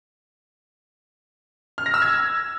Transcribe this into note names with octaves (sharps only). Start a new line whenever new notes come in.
F6
A#6
E6
G#6